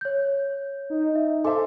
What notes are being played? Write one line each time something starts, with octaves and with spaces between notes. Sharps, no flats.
C#5 G6
D#4
E5
A4 C5 E5 G#5 C6 D6